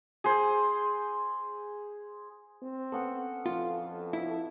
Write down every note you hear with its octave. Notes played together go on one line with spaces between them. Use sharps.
G#4 C5
C4
B3 C#4 A4 F#5
F2 F4
E4